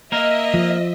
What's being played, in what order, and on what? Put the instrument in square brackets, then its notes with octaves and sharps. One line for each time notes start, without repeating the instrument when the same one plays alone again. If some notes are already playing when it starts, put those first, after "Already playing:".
[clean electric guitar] A#3 A#4 [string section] D#5 E5
[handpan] F3